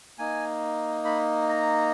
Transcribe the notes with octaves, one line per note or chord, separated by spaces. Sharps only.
A#3 D#4 G#5
B5
A#5